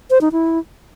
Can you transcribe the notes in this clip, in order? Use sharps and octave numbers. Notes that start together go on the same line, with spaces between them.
C5
D#4
E4